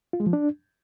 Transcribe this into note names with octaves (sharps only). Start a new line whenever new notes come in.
F4
G#3
F3
D4